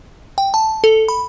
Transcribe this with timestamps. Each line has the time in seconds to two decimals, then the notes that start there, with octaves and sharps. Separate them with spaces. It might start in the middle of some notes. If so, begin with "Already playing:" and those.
0.38 G5
0.54 A5
0.84 A4
1.08 B5